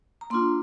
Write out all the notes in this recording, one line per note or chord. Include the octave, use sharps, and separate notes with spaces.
A#5
A#3 D4 F4 C6